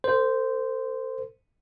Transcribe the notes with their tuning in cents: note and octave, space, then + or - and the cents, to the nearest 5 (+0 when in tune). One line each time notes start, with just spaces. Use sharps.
A4 +45 C5 -10